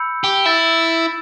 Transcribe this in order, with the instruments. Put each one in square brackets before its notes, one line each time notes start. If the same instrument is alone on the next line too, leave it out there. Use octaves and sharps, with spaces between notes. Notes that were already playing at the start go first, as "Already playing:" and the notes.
Already playing: [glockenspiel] B5 E6 G6 C#7
[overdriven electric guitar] G4
[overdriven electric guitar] E4 [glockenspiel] E6 A6 E7